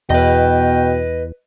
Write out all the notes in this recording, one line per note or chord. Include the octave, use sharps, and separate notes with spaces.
E2 B2 B4 D#5 G5